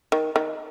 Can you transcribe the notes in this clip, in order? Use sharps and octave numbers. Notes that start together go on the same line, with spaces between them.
D#3
D#3